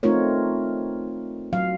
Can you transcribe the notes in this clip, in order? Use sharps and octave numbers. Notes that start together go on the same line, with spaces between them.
A3 C4 D#4 F4 A#4 C#5
F#3 F5